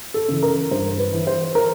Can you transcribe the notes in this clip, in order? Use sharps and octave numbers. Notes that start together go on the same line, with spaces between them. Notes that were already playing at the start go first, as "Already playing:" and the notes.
A4
C#3 E3
A#4
G2 C5
B4
E3
C5
A#4